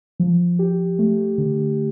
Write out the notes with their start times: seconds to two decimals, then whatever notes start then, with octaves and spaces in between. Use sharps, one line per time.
0.20 F3
0.59 G4
0.99 A3
1.38 D3